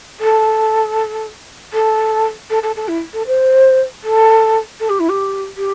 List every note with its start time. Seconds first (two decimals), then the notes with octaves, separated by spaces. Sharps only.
0.20 A4
1.73 A4
2.50 A4
2.62 A4
2.76 A4
2.88 E4
3.13 A4
3.27 C5
4.03 A4
4.80 A4
4.89 G4
4.99 E4
5.09 G4
5.57 G4